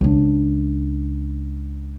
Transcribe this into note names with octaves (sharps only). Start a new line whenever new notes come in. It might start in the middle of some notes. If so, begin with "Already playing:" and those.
C#2 D4